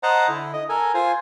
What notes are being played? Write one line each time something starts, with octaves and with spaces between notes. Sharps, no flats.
C5 D#5 F#5 A5 A#5
D3 E4
D#5
A4 A#4 G#5
F4 C5 G#5